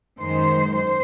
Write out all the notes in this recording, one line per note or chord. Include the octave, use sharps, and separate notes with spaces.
F#2 D#3 G#3 C5
C5